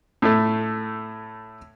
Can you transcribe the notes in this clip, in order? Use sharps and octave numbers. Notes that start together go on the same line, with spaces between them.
A2 A3